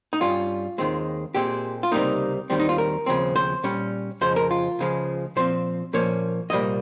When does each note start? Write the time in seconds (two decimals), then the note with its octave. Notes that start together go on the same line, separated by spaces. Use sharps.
0.13 D#4
0.21 G2 G3 C#4 F4
0.78 D#2 D#3 G#3 C4
1.35 A#2 G#3 C4 G4
1.83 F4
1.92 C#2 C3 G3 A#3 D#4
2.50 D#2 D#3 G3 C4
2.59 D#4
2.69 F4
2.78 A#4
3.06 D#2 C#3 F3 C4
3.36 C5
3.63 A#2 G3 C#4
4.21 F2 C#3 F3 G#3 C5
4.36 A#4
4.51 F4
4.79 C#2 C#3 F3 G#3
5.36 A#2 F3 C4 C5
5.93 A#2 F3 A#3 C#4 C#5
6.50 C2 A#2 G3 A#3 D#5